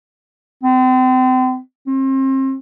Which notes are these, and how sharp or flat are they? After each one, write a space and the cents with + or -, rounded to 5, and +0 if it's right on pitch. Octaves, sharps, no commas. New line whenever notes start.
C4 -35
C4 +35